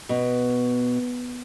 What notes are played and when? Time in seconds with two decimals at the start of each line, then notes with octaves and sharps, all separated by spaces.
0.09 B2